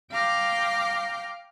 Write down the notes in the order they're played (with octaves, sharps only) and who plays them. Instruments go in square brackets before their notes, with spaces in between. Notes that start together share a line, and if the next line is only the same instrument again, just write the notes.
[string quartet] F5 G5 A#5 D6 F6 G6